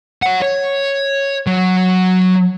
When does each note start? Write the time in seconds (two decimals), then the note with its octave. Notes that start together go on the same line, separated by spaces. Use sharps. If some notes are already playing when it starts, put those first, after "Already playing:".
0.23 C#5 F#5
0.42 C#5
1.47 F#3